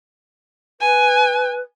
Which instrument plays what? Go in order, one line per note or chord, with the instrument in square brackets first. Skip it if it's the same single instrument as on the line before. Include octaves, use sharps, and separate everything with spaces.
[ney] B4 [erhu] G#5